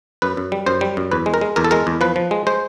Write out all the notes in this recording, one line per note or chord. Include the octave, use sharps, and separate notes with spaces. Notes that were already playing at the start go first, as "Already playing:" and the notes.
F#2 B4
F#2
G3
F#2 C5
G3
F#2
E2 B4
G#3
A#4
G#3
E2 A#4
A4
G#3 A#4
E2
F3 B4
F3
G#3
G#3 C5